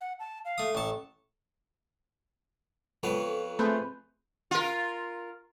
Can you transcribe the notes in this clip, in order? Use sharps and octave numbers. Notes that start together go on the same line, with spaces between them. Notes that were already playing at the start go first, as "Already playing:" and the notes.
F#5
A5
F5
A3 D#6
A1 A5 C#6
F2 B3 A4 C#5
A3 C4 G#4 B4 C6 G6
F4 A#4